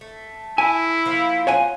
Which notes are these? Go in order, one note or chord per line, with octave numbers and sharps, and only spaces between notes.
A3
E4 G#5
F3 A#3 F4
C#5 F#5 G#5